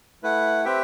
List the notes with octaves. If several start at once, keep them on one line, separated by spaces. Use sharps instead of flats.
A3 E4 B4 F#5
C4 G4 B4 E5 G5